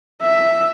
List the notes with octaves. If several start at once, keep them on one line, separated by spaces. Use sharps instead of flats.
E5